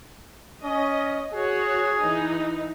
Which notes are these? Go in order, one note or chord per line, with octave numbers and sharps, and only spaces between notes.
C#4 D#5
F#4 G#4 C#5
E3 D#4